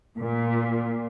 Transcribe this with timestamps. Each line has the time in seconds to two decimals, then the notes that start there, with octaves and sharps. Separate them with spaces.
0.15 A#2